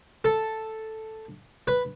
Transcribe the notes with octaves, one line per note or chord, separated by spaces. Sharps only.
A4
B4